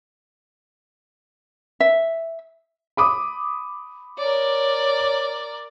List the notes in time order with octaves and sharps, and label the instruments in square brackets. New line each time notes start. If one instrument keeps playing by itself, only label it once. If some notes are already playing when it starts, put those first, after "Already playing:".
[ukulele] E5
[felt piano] B5 D6 D#6
[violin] A#4 D5 [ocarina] C#5